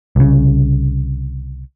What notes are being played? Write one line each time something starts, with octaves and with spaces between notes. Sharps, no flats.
C2 C#3